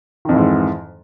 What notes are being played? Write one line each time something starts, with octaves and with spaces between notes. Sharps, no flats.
F2 G#2 D#3 E3